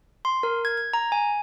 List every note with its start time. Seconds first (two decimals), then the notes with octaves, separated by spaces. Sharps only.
0.25 C6
0.43 A#4
0.65 G#6
0.77 G#6
0.93 A#5
1.12 G#5